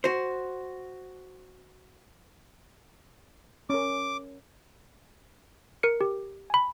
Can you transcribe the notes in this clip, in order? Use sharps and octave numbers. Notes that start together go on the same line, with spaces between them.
F#4 C5
C#4 A#4 D6
A#4 C#7
G4
G#5 B5